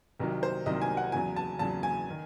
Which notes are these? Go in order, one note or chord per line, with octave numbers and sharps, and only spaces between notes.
C2 C3 D#3 F#3
C5
C2 C3 D#3 F#3 D#5
G#5
F#5
E2 C#3 F#3 G#5
A5
E2 C#3 F#3 A5
G#5
D#3